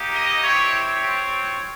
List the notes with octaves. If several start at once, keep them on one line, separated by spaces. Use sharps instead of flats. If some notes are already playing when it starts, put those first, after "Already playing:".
Already playing: A#3 D#4 G4
D#5
C4 E4 G4 C#5
C#5
C4 F4